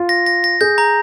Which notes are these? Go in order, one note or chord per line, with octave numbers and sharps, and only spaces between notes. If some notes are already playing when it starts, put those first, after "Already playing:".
Already playing: F4
A#6
A#6
A#6
G#4 G6
A#5